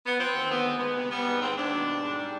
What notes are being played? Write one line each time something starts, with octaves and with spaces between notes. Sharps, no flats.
B3
F3 C4
D#2
D2 B3
G#3
G#3 B3
C3
G3 B3
G#2
D#2 C4
D#2 D4
B2
G3
G#2
G3